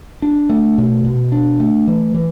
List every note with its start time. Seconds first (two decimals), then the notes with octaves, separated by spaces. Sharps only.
0.22 D4
0.49 A3
0.78 B2
1.04 B2
1.32 D4
1.60 A3
1.87 E3
2.14 E3